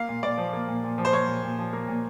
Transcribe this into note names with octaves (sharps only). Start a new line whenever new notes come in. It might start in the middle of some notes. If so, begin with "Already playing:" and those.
Already playing: A#3 F5
A#2
A#2 D5
F3
A#3
A#2
A#2
F3
C5
A#3 C#5
A#2
A#2
F3
A#3
A#2